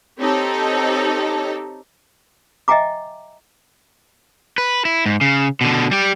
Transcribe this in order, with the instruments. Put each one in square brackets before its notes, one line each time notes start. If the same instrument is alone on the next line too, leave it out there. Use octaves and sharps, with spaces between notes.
[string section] C4 D#4 G4 A4 C#5
[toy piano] D#5 E5 G5 G#5 A#5 D6
[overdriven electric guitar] B4
E4
G#2
C#3
B2 D3
G3 G4